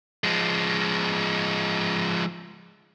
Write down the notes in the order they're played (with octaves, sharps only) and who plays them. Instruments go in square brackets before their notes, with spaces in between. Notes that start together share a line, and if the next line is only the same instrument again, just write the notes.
[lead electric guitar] F3 G#3